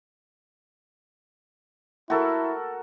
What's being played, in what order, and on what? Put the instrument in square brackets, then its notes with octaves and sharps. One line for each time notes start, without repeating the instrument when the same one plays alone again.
[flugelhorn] E4 [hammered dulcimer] F#4 A4 A#4